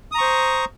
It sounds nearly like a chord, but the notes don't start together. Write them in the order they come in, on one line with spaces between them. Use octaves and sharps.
D#6 A#5 C#6 C5